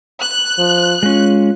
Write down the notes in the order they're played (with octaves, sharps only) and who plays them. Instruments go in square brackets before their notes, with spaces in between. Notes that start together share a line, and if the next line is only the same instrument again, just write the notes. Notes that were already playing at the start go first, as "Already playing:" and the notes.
[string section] F#6
[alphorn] F3
[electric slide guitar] G#3 C#4 [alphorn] F4